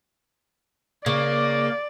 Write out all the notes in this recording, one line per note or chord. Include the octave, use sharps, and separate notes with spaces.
C#3 A#3 D5